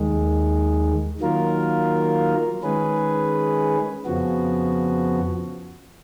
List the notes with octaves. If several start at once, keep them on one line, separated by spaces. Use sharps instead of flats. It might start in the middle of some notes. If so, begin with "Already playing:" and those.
Already playing: D#2 D#3 G#3
D#3 F#3 A#3 F4 A#4
D#3 G#3 C#4 G#4 B4
F2 C#3 F3 B3 F#4